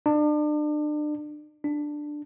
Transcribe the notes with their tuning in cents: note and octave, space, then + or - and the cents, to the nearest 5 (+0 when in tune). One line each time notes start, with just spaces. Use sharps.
D4 +35
D4 +10